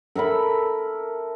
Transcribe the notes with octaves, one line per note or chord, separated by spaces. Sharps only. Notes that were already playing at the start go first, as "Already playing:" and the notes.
A4 A#4 E5 B5